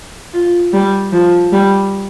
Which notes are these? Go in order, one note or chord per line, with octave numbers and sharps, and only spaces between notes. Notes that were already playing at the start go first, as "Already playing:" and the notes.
F4
G3
F3
G3